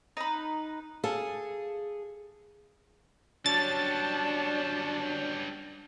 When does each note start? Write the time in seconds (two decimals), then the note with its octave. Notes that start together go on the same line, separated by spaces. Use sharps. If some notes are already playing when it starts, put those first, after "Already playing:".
0.17 D#4 B4
1.04 G#4 A4 F5 A5
3.46 F#3 G3 B3 C#4 D4 A5 A6